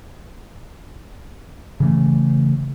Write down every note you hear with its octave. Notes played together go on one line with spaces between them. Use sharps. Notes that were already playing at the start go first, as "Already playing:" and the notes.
C#3 E3 A3